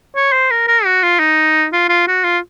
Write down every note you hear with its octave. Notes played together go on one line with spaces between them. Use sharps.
C#5
C5
A#4
A#4
F#4
F4
D#4
F4
F4
F#4
F4